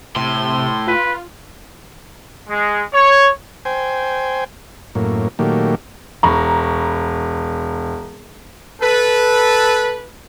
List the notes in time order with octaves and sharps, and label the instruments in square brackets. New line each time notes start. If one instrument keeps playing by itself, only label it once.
[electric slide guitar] A2 [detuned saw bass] C3 [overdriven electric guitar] C6
[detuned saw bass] F4 [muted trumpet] B4
[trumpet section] G#3
C#5
[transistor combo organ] C5 G5 G#5
F#2 A2 A#3
A#2 D#3 F#3 A3 A#3 G4
[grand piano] E1 [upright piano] A#5 B5 C#6
[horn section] A4 B4